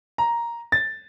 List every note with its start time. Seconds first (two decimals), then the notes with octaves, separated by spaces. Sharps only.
0.18 A#5
0.72 A6